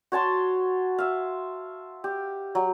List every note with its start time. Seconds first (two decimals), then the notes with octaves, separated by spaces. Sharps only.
0.12 F#4 C#5 A5 C6
0.98 E5 F5
2.04 G4
2.55 F#3